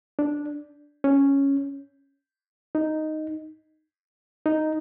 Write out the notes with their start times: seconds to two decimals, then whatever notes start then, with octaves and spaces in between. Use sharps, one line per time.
0.19 D4
1.04 C#4
2.75 D#4
4.46 D#4